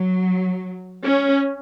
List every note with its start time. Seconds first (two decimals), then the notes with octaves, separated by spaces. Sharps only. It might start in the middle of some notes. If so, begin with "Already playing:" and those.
Already playing: F#3
1.04 C#4